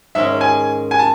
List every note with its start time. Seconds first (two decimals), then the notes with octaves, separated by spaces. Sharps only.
0.15 G#2 D#3 G#3 C#4 E5
0.41 G#5
0.91 G#5
0.99 A5